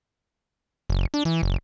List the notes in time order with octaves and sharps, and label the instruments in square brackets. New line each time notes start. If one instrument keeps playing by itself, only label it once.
[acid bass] F#1
D4
E3
F#1